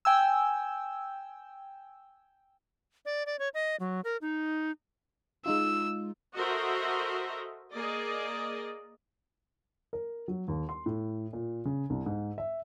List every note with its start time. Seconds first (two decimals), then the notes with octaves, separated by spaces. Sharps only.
0.05 G5 G#5 E6
3.05 D5
3.26 D5
3.39 C#5
3.54 D#5
3.80 F#3
4.04 A#4
4.21 D#4
5.46 G#3 D#4 F4 E6
6.35 F#4 A4 A#4 C5 D#5 E5
7.74 A#3 G#4 D5 D#5
9.93 A#4
10.28 F#3
10.48 D#2
10.69 C6
10.86 A2
11.33 A#2
11.65 C#3
11.90 C2
12.06 G#2
12.38 E5